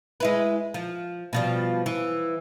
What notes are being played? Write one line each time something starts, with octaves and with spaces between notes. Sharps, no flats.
G#3 E4 B4
F3
B2 F3 G3
E3